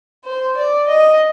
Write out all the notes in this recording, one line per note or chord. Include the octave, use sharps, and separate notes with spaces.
C5
D5
D#5